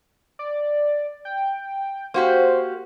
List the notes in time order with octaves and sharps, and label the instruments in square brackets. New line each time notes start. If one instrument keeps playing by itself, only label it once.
[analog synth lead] D5
G5
[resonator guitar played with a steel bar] A#3 F#4 G4 [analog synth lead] C5